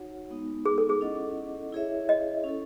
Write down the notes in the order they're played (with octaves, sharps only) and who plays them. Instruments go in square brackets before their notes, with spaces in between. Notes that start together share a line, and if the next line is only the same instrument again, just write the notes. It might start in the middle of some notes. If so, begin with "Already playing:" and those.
Already playing: [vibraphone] D#4 F#4 C#5 F#5
G#3 B3 D#4
[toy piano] G#4
A4
G#4
[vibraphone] C#4 E4 A4 D#5 F#5
E4 G#4 C#5 E5
[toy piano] D#5
[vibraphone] C#4 E4 A4